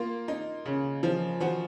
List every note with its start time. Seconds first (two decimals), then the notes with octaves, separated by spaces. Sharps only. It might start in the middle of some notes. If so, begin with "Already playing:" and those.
Already playing: A#3 F4
0.28 D#4
0.65 C#3
1.03 F3
1.40 F3 F#4